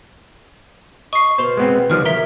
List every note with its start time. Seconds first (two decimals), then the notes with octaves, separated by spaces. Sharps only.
1.13 D#5 C#6 C7
1.38 B2 C5 F5 C6
1.57 G#3 B3 C4
1.90 D#3 F3 G3 B4 F6
2.05 A#4 C#5 E5 B6 G7